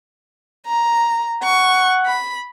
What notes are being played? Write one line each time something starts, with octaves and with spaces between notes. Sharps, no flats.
A#5
F#5 C#6
B5